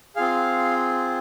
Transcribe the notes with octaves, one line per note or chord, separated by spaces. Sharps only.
C4 F4 G#4 F5